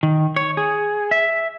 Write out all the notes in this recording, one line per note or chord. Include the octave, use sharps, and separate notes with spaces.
D#3
C#5
G#4
E5